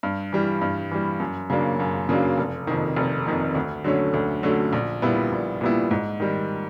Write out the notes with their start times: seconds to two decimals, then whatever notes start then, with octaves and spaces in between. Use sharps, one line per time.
0.03 G2
0.33 E3 G3
0.61 G2
0.91 E3 G3
1.20 F#2
1.50 C#3 F#3 A#3 D4
1.80 F#2
2.09 C#3 F#3 A#3 D4
2.38 F1
2.67 F2 C3 D#3
2.96 F1
3.26 F2 C3 D#3
3.55 D2
3.84 D3 F#3 A3 C#4
4.14 D2
4.43 D3 F#3 A3 C#4
4.73 A#1
5.02 A#2 G3 B3 E4
5.31 A#1
5.61 A#2 G3 B3 E4
5.91 G#2
6.20 D#3 G3